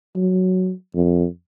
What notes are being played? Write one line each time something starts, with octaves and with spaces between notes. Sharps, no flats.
F#3
F2